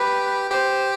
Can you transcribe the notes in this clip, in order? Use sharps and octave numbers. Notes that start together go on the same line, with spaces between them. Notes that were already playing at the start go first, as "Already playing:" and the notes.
Already playing: G4 B4
G4 C5